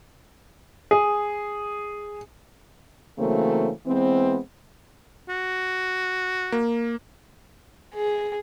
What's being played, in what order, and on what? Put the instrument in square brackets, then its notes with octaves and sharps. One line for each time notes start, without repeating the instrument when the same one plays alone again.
[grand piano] G#4
[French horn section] C#3 E3 F#3 A3 A#3 C4
E3 G#3 B3 C4
[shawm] F#4
[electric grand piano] A#3
[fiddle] G#4